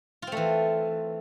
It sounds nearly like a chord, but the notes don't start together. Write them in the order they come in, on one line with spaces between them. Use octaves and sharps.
F4 C4 A3 E3